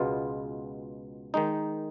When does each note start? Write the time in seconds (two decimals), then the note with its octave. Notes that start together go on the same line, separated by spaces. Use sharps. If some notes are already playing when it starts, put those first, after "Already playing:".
Already playing: C#2 B2 G#3 B3 F4
1.34 D#3 G#3 D#4